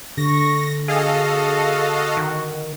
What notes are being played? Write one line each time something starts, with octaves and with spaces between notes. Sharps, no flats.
D3 C#6 A#6
F#4 G#4 A4 D#5 F5
D#3